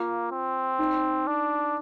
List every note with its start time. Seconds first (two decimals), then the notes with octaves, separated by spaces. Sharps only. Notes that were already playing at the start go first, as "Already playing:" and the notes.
Already playing: A#3 F4
0.31 C4
0.79 D#4
1.27 D4